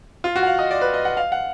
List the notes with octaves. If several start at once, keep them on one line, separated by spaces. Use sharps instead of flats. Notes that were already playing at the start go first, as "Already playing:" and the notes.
F4
F#4
F#5
F5
D#5
D5
B4
D#5
F#5
F5
F#5